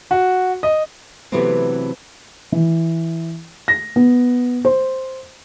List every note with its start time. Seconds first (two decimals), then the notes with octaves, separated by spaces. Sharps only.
0.11 F#4
0.63 D#5
1.32 C3 E3 F#3 A3 B3 C4
2.52 E3
3.68 A#6
3.96 B3
4.65 C5